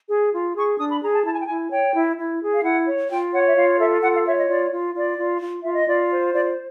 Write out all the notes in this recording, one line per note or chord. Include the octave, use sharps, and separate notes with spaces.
G#4
F4
G#4 C#6
D4 D#6
B5
G#4 A#5
A5
E4 A5
G#5
G5
E4 G#5
C#5 G5
E4
E4
G#4
F5
E4 F#5
C#5
F4 G5
C#5 F#5
E5
F4 F5
A4 E5
F4 F#5
F5
C#5 E5
D#5
F4 D5
F4
F4 D5
F4
F4
F4 E5
D#5
F4 D5
C5
F4 D5